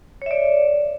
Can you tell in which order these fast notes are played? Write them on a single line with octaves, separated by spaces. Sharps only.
C#5 E5 D5